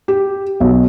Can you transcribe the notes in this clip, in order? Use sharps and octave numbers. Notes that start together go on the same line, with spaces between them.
G4
B1